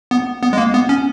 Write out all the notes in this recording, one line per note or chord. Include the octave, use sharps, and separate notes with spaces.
B3
B3
G#3
A#3
B3
C#4